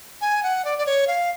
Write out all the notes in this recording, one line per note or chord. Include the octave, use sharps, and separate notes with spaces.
G#5
F#5
D5
D5
C#5
F5